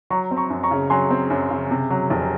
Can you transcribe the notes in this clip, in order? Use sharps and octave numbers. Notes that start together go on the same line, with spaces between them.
F#3 A#5 C#6
C4
A#5 C#6
F#2
A#5 C#6
C#3
F#3 G#5 C6
C4
F#2
C#3
C3
F#3
F1